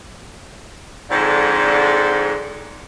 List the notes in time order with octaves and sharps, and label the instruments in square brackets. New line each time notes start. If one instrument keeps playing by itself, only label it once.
[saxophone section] F2 G#2 D3